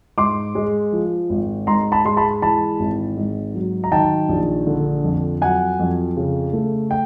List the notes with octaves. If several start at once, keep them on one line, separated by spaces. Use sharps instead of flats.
G#2 C6 D6
G#3
F3
G#1
G#2 A#5 C6
A5 B5
G#3 C6
A5 B5
E3 A5 B5
G#1
G#2
F#3
A#5
D#3 G5 A5
A#1
D3
F2
F#3 F#5 G#5
F2
C#3
A3
G5